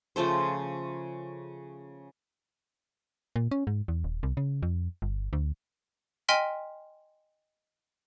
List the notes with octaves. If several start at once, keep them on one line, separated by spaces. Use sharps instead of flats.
C#3 F3 A3 C5
A#2
C#4
G#2
E2
D#1
C2
C#3
F2
G1
D2
D#5 G5 G#5 C6 F6 B6